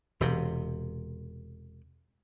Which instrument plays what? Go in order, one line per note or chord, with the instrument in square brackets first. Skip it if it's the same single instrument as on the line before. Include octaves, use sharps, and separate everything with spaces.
[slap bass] E1 C3